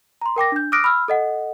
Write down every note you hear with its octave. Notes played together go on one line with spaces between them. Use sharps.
A#5 C6
A#4 G5 D6 A#6
D4 G6
D6 D#6 F6 F#6 A#6 D7
B5 E6 F6
A4 D#5 F#5